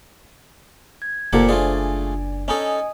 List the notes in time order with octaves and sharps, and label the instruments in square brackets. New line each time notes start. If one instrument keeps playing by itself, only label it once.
[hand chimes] G#6
[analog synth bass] F#1 [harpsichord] A#2 G4 F#5 [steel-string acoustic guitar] A#3 A4 [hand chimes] C5
[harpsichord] A3 F4 G#4 [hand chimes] D4 G#5 [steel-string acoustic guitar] D5
[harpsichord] C#4 D#4 A4 [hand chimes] D#5 G#5 D#6